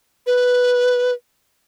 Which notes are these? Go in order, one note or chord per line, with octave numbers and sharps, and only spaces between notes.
B4